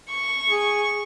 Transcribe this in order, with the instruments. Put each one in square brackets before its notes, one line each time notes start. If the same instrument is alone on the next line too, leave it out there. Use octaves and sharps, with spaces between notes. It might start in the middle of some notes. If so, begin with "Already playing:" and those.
[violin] C#6
[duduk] G#4